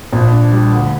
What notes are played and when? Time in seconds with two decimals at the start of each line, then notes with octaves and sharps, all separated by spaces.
0.13 A#1
0.32 D4
0.52 G3
0.72 D2